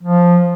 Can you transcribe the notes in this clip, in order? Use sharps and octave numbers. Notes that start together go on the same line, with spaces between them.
F3